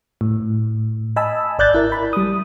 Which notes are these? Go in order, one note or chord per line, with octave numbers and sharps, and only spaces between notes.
A2
D#5 G#5 A5 B5 E6
G#1 D5 F#6 G6 A6
E4 A#4
B5
G3 D#6